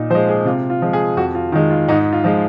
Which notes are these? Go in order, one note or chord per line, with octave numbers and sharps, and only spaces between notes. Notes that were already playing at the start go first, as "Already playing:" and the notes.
Already playing: A#2 D#4
F3 G#3 C5
G#4
C3 F4
F4
F3 G#3
G#4
F2 F#4
F4
D#3 G#3
F4
G#2 D#4
F4
F3 G#3